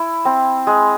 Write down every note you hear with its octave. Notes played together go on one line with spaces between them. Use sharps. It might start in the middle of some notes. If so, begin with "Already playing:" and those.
Already playing: E4
C4
G#3